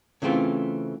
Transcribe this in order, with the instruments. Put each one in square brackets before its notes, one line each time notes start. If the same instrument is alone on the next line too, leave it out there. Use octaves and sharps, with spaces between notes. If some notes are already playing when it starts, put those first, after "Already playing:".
[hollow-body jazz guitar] C#3 E3 A3 C4 F4